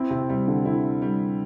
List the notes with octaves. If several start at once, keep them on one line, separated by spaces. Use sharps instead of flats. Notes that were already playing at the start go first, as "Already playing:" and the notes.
Already playing: C4 E4
C3
C3 G3
D3
D3 E4
G3